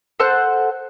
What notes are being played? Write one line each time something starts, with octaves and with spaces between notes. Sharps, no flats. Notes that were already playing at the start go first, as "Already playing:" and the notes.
A4 C5 F#5 F#6